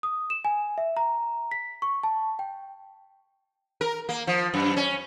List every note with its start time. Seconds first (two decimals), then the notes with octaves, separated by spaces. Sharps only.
0.03 D#6
0.30 E7
0.45 G#5
0.78 E5
0.97 A#5
1.51 B6
1.82 C#6
2.03 A5
2.39 G5
3.81 A#4
4.09 A#3
4.27 F3
4.54 F#2
4.77 C#4